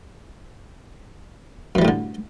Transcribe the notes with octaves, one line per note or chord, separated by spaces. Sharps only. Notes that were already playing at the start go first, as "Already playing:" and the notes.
F#2 A2 D3 E3 G3